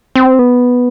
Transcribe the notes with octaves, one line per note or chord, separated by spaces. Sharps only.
C4
B3